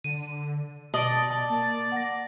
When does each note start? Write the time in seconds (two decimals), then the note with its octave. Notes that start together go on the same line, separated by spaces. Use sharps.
0.04 D3 D#7
0.94 B2 D5 D#5 A5
1.30 A5
1.49 A#3
1.92 F#5 A#6